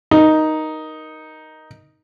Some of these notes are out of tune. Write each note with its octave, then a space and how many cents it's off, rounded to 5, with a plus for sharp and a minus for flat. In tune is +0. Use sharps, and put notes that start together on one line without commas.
D#4 +0 A#4 +15